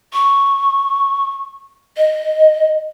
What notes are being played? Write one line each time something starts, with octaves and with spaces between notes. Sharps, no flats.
C#6
D#5